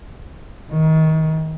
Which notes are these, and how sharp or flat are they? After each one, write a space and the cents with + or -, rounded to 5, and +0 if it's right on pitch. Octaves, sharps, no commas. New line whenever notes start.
D#3 +30